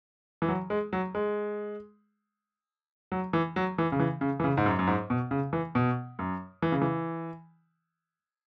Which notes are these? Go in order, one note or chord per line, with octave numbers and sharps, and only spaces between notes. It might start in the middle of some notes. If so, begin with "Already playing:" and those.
E3
F#3
G#3
F#3
G#3
F#3
E3
F#3
E3
C#3
E3
C#3
E3
C#3
G#2
F#2
F#2
G#2
B2
C#3
E3
B2
F#2
E3
C#3
E3